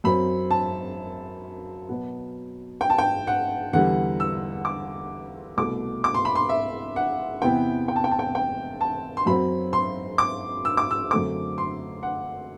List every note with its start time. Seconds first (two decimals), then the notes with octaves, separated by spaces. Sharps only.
0.04 F#2 F#3 C4 B5
0.51 A5
1.89 B2 F#3 B3
2.81 G5
2.90 A5
2.98 G5
3.27 F#5
3.73 E2 D3 G3 F#5
4.20 E6
4.65 D6
5.57 C2 B2 A3 D6
6.04 D6
6.14 C6
6.25 B5
6.35 C6
6.49 E5
6.96 F#5
7.42 E2 C3 E3 B3 G5
7.88 G5
7.96 A5
8.04 G5
8.11 A5
8.19 G5
8.35 G5
8.81 A5
9.17 C6
9.26 F#2 F#3 C4 B5
9.73 C6
10.18 D6
10.65 E6
10.77 D6
10.91 E6
11.11 F#2 D3 A3 C4 D6
11.58 C6
12.03 F#5